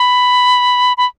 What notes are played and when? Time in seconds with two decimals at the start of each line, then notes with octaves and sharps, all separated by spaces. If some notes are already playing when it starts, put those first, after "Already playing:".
Already playing: B5
0.98 B5